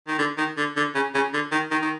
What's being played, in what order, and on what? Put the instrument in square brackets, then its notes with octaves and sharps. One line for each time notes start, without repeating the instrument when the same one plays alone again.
[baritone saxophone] D#3
D3
D#3
D3
D3
C#3
C#3
D3
D#3
D#3
D#3